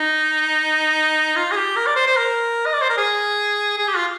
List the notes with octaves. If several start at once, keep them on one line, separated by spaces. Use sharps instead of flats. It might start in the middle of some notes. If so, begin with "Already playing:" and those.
Already playing: D#4
F4
G#4
G4
A#4
D5
C5
C5
A#4
D#5
D5
C5
A#4
G#4
G#4
G4
F4